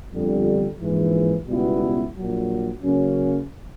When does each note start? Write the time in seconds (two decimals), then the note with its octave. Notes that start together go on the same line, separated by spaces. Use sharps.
0.13 G1 F2 D3 G3
0.80 A#1 G#2 E3
1.48 C#2 B2 G3 B3 E4
2.15 A#1 A#2 F#3
2.83 C#3 F#3 A#3 C#4